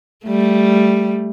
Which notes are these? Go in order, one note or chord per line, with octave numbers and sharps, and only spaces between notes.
G3 A3